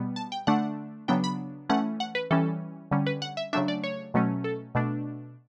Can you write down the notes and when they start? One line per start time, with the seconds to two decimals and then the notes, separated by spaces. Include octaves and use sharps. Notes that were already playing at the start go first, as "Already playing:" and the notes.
Already playing: B2 G3 B3
0.16 A5
0.32 G5
0.47 D3 A3 D4 F#5
1.08 C#3 F#3 B3 D4 G5
1.24 B5
1.69 E3 A3 C#4 F#5
2.00 F#5
2.15 B4
2.31 E3 G3 C#4 A4
2.91 D3 G3 C#4
3.07 B4
3.22 F#5
3.37 E5
3.53 C#3 F#3 A3 D4 E5
3.68 D5
3.84 C#5
4.14 B2 F#3 A3 C#4
4.44 A4
4.75 B2 A3 D4